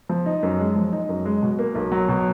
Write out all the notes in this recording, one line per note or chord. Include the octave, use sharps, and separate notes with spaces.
F3
D#4
F#2
G#3
F3
D#4
F#2
G#3
B2
A#3
B1
F#3
B2